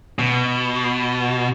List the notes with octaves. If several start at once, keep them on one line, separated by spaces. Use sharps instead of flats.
B2